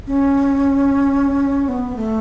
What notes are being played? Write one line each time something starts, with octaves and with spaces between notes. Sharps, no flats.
C#4
B3
A3